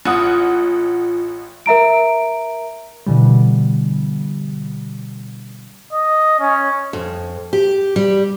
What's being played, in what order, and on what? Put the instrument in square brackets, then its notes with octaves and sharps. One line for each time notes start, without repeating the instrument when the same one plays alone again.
[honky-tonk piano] A1 F#5 D#6 [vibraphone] F4
[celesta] A#4 E5 A#5 D7
[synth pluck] B2 D3 E3 G3
[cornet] D#5
C#4
[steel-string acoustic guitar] F2
G4
G3